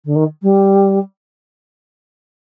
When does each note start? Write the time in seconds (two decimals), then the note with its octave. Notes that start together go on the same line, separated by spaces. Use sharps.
0.05 D3
0.15 D#3
0.43 G3